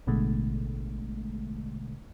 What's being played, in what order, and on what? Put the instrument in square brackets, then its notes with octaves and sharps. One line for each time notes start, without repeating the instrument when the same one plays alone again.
[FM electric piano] A1 B2 D3 G#3 A3